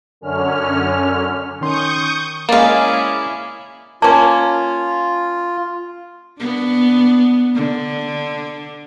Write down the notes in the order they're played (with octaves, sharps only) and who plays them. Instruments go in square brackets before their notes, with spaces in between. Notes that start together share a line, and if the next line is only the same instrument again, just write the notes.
[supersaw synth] F#2 D3 C#4 F6
[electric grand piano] D#3 C#4 C6 [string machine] C#6 D#6 G6
[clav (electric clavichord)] G#3 A#3 [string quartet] C#4 E4 G#4 [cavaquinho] D5 F5
[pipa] A#3 C#4 [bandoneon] F4 [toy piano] A5
[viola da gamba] B3 D4
D3